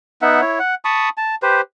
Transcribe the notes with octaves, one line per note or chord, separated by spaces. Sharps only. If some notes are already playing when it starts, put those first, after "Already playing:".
B3 D#4 E5 F#5
E4 C#5
F#5
A5 B5 C#6 D#6
A5
G4 B4 C5